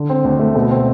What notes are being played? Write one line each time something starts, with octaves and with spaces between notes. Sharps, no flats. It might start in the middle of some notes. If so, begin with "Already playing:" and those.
Already playing: D3
C4
D2
A3
B2
C4